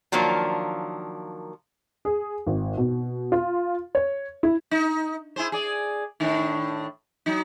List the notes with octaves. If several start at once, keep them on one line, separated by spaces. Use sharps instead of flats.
D#3 F3 F#3 A#3 D4
G#4
G#1
B2
F4
C#5
E4
D#4
E4 G#4 C5
G#4 D5
A2 D#3 D4
F#3 D#4